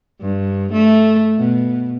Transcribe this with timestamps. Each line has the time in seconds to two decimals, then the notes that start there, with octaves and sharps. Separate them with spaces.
0.21 G2
0.72 A3
1.38 B2